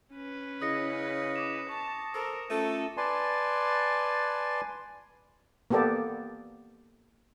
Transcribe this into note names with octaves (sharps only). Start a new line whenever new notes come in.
C#4 B4
C#3 E4 G#4 D#5 D#6 A#6 C#7
D6 E7
A5 C#6 E7
A4 A#4 C5
A3 C#4 F4 A4 E5 D#7
B4 D5 G#5 A5 C6
A#3 B3 G4 A4 D5